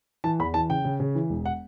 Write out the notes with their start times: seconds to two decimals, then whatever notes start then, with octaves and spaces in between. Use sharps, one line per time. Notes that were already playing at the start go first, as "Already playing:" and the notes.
0.24 E3 A5
0.39 E2 B5
0.54 E3 A5
0.69 C#3 G5
0.85 C#3
1.00 C#3
1.15 E3
1.30 E1
1.45 F#5